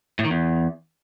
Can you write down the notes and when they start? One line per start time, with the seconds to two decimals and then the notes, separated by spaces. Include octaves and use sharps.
0.19 A2
0.25 D#3
0.30 E2